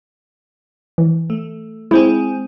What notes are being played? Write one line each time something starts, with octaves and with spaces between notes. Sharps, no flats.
E3
A3
G#3 C4 E4 G#4